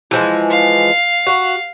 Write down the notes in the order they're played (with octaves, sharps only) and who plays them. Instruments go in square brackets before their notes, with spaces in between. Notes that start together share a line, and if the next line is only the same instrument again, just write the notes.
[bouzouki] E3 F3 G#3
[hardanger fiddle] F5
[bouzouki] F#4